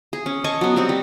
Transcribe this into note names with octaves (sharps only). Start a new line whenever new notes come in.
G#4
C#4
C#5 D#5 A5 C#6
F#3 B3
G3 C4 F#4
G3